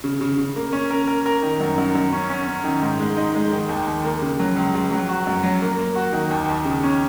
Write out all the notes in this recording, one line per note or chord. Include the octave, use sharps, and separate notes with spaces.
C#3
C#3
C#3
A#3
C#4
A#4
A#4
A#4
D#3
F#2
F#2
F#2
C#4
C#4
C#4
D#3
G#2
G#3
D#4
G#3
D#3
D#2
D#2
A#3
C#3
F#3
C#2
C#2
F#3
F#4
F#2
F#3
A#3
A#3
F#4
D#3
D#2
D#2
C#3
C#4